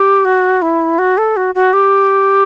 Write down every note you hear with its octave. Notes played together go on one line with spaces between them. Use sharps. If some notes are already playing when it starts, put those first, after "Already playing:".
Already playing: G4
F#4
E4
F#4
A4
F#4
F#4
G4